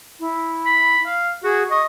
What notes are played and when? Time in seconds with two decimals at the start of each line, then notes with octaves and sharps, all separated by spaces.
0.20 E4
0.65 B5
1.06 F5
1.44 F#4 G#4
1.71 D#5 C#6